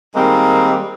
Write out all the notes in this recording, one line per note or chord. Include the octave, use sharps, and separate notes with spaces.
D#3 G3 G#3 A#3 C4